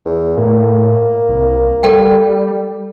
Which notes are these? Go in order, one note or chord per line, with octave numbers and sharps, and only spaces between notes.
E2
A2 A#3
C2
G3 A4 F#5 G5